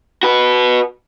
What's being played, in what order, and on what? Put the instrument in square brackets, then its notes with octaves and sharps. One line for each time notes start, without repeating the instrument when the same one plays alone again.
[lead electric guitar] F#4 B4